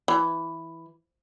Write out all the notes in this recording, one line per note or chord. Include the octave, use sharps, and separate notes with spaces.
E3